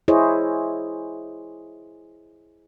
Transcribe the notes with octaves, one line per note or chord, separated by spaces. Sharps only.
E4 G#4 C5 C#5 D#5